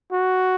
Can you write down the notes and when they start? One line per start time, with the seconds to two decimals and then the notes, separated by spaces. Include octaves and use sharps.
0.13 F#4